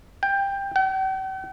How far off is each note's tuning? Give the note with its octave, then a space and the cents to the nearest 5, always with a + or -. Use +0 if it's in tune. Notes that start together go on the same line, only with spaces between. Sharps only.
G5 +15
G5 -45